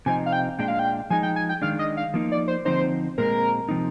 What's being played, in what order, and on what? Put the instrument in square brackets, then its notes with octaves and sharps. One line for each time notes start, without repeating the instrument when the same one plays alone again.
[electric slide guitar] C3 F3 C4 D#4 [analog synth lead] G#5
[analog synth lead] F5
G5
[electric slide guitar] A#2 G#3 D4 [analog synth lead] G5
[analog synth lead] F5
G5
[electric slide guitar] F3 G#3 D#4 [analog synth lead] G#5
[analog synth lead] G5
G#5
G5
[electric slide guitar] D#3 G#3 D4 [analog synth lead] F5
[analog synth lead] D#5
F5
[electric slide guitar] F3 A#3 D#4
[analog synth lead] D5
C5
[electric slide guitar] D3 F3 C4 D#4 [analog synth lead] C5
[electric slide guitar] A#2 G#3 C4 [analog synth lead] A#4
[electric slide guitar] C3 F3 C4 D#4